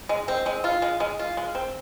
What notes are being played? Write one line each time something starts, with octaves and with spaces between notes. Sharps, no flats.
G#3
C4
G#3
F4
G#3
G#3
F4
G#3
C4